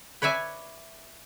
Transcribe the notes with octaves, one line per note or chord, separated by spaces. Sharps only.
B4 C#5 D5 E5 G#5